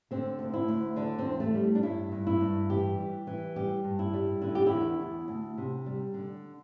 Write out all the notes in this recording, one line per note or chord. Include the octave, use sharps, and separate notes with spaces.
D3 C4
D2
E4
D2
D3 D4
C4
E2
A3
G3
D4
G2 E4
G2
E4
G2
E3 G4
G3
E3
G3 G4
G2
E4
G3
D3 E4
G4
E2 E4
E2
D2
C3
G3
D3